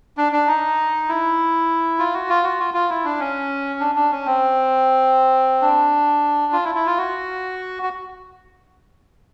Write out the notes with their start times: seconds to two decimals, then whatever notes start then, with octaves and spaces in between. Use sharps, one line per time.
0.17 D4
0.32 D4
0.47 D#4
1.09 E4
1.99 F4
2.14 F#4
2.29 F4
2.44 F#4
2.59 F4
2.74 F4
2.90 E4
3.04 D4
3.20 C#4
3.80 D4
3.95 D4
4.11 C#4
4.26 C4
5.62 D4
6.53 F4
6.64 E4
6.75 E4
6.86 F4
6.97 F#4
7.83 F#4